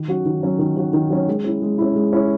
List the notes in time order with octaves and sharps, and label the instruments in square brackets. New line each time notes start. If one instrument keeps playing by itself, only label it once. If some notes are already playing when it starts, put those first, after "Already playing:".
Already playing: [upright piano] D#3
F#3 C#4 F#4
D#3
F#3 C#4 F#4
D#3
F#3 C#4 F#4
D#3
F#3 C#4 F#4
G#3
C#4 E4
G#3
C#4 E4
G#3
C#4 E4